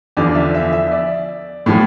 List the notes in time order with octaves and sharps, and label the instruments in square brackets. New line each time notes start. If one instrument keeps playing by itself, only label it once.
[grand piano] E2 D3 F3 D5
E5
E5
E5
D5
A2 F3